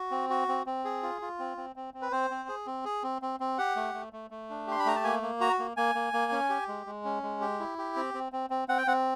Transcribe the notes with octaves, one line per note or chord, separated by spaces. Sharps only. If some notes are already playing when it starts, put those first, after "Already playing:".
Already playing: F#4
C4
F#4
C4
C4
G#4
F4
F4
C4
C4
C4
C4
B4
C4 C5
C4
G#4
C4
G#4
C4
C4
C4
G4 F#5
A3
A3
A3
A3
D4
G4 C6
B5
A3 A#5
A5
A#3 G#5
A#3
F#4 A#5
A#3
A#3 G#5
A#3
A#3
C#4
G4
G#3
G#3
C#4
G#3
G4
E4
G4
C4
C4
C4
C4
C4 F#5
G5
C4 F#5